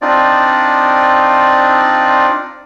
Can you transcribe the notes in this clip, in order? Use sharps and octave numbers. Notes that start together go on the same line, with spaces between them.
C4 D4 D#4 F4 D5